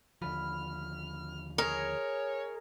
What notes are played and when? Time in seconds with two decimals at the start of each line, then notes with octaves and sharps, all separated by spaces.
0.22 D#2 D3 F3 B5 F6
1.58 G#4 A#4 C#5 D#5